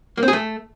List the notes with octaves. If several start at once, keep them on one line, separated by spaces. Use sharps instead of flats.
A#3
C4
G#4
A3